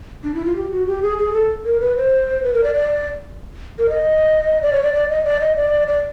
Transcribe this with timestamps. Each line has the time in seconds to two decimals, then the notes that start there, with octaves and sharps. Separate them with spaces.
0.24 D4
0.34 E4
0.45 F4
0.56 G4
0.71 F#4
0.87 G4
1.02 G#4
1.18 G#4
1.33 A4
1.65 A#4
1.80 B4
1.97 C5
2.43 B4
2.54 A#4
2.64 D5
2.74 D5
3.79 A#4
3.89 D#5
4.62 D5
4.73 C#5
4.83 D5
4.94 D5
5.09 D#5
5.24 D5
5.41 D#5
5.56 D5
5.88 D5